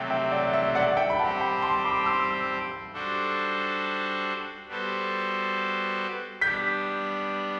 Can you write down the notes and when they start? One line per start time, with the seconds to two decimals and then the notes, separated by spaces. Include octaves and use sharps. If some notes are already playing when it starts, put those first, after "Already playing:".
Already playing: C3 F#3 A3 E5 G5
0.10 E5 G5
0.31 D5 F#5
0.53 E5
0.75 D5 F#5
0.97 E5 G5
1.10 B5
1.19 G3 C4 G4 C5 F#5 A5
1.41 G5 B5
1.62 A5 C6
1.85 B5 D6
2.06 C6 E6
2.93 G3 D4 F#4 A4 C5
4.67 G3 B3 F#4 A4 C5
6.41 G3 B3 D4 G6 B6